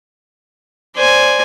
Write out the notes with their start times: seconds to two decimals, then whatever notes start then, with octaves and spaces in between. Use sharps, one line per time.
0.96 C5 D5 G#5